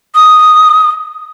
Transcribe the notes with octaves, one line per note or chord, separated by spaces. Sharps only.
D#6